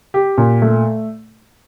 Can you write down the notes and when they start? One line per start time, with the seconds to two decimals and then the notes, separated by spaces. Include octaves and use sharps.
0.14 G4
0.38 A#2
0.62 A3